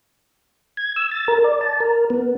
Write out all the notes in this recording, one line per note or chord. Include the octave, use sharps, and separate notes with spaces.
G#6
E6
A6
A#4
D5
A5
A#4
B3